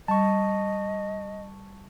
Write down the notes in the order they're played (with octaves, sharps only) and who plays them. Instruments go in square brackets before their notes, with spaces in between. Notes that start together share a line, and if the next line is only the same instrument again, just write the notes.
[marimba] G3 [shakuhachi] D#5 [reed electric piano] A5 C#6